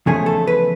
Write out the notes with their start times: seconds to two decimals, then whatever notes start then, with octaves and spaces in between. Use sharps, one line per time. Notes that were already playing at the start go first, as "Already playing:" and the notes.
0.06 E2 C#3 F3 A3 G#4
0.26 A4
0.47 B4